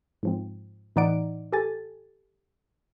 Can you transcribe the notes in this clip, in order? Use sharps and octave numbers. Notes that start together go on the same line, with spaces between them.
G#2 F3 C4
A2 E3 D#4 D5 F#5 D7
G4 A4 G#5 A6